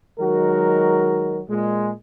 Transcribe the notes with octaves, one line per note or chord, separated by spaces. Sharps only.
D#3 F#3 G#3 F#4 A#4
A#2 G#3